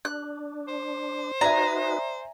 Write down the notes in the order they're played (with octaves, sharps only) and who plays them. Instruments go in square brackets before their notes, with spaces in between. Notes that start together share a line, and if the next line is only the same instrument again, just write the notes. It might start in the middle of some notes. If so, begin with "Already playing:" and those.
[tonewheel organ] D4 [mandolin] F#6
[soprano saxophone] C5
[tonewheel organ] D#4 F#4 B4 [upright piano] D5 E5 [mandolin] G#5 A#5